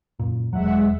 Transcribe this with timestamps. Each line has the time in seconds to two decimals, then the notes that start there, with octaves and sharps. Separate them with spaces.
0.19 F#2 A#2
0.53 E1 F#3 G#3 E5 F#5